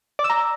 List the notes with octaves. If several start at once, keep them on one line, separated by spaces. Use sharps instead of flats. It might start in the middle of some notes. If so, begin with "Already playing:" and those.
D5
E6
A#5